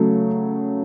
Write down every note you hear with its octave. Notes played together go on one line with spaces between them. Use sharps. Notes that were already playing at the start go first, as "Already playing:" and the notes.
Already playing: C#3 F#3 A3